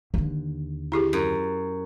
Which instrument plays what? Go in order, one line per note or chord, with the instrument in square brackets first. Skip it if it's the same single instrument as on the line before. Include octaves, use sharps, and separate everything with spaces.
[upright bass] D#2 D3
[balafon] E4 G4 G#4
[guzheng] F#2